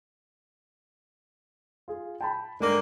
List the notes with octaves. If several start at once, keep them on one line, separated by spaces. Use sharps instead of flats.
F4 G#4
G5 A5 B5
G2 D3 G#3 A#3